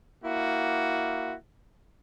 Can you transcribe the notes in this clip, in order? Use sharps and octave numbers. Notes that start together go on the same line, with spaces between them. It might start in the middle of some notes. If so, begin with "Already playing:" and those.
A#3 E4 F#4